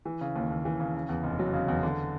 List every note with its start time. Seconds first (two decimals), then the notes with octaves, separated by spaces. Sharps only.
0.05 E3
0.21 C#3
0.36 D#2
0.50 D#2
0.65 E3
0.80 C#3
0.95 C#3
1.09 E2
1.24 F1
1.39 F#3
1.54 C#3
1.68 E2
1.83 D3